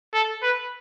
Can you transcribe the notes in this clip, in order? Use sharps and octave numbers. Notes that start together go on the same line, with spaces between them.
A4
B4